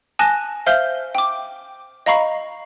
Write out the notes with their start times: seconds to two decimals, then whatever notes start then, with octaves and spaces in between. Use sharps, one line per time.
0.19 G#5 A5 F#6 A#6
0.66 C5 E5 F5 F6 G6 G7
1.15 G5 D6
2.06 D#5 F5 A#5 B5 C#6 C7